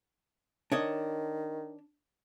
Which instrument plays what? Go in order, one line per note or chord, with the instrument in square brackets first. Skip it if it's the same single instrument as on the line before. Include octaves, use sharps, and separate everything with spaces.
[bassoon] D#3 [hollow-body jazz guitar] D4 C#5 D#5